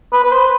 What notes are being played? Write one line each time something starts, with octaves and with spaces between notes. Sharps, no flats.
B4
B4
C5